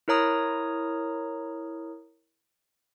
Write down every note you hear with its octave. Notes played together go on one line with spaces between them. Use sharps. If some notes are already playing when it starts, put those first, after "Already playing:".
E4 A#4 C#5 A#5 D#6